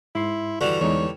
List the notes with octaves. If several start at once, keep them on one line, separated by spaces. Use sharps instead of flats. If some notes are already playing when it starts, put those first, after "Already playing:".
G#2 E4 C6
D3 E3 G3 F#4
E2 G#3 D#4 C#5